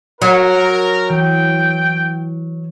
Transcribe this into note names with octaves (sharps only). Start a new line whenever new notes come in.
F#3 A#4
E3 G5